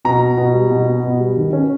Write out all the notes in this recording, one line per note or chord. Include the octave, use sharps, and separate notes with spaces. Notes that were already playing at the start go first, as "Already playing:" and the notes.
B2 A#5
B3
B2
G3
B2
B3
B2
G3
D#3
C#4